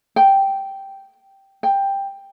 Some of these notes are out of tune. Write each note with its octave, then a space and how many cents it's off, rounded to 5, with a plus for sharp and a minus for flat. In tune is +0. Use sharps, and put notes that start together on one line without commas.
G5 -5
G5 +10